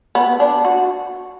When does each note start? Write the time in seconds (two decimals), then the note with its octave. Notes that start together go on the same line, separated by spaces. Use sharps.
0.15 B3
0.40 D4
0.65 F#4